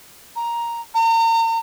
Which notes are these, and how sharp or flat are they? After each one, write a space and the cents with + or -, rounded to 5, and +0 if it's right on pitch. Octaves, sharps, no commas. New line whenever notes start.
A#5 +5
A#5 -40